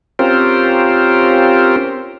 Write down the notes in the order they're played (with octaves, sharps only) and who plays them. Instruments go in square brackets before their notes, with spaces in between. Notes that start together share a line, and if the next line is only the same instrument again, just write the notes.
[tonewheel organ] C4 C#4 F4 G4 A#4 C5